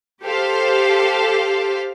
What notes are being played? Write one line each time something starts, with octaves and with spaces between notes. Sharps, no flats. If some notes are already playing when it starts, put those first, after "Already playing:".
G4 A4 C5 F5